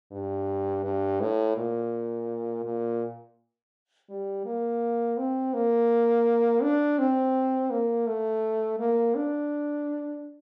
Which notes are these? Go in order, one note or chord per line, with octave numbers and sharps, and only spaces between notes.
G2
G2
A2
A#2
A#2
G3
A#3
C4
A#3
D4
C4
A#3
A3
A#3
D4